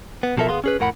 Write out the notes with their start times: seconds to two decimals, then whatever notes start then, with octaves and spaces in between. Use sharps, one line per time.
0.23 B3
0.37 B1 B2 F3 A4 A#4 E5
0.49 D2 B3 G#4 F5 C6
0.64 C#4 G#4 B4
0.79 F2 A2 A#4 F#5 B5